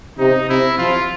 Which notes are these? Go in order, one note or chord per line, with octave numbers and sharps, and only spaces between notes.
C3 D#4
C3 E4
F3 F4